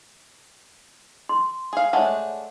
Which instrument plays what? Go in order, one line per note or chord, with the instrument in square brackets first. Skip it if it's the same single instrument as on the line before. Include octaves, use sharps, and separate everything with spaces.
[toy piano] C6
[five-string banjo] G#4 F5
[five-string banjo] G#3 A3 D4 [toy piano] C#5 E5 F#5